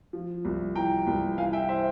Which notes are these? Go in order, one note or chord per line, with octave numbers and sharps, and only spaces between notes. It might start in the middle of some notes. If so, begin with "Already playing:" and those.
F3
C2
E3 G5 A#5
C2
E3 F5 G#5
E5 G5
C5 E5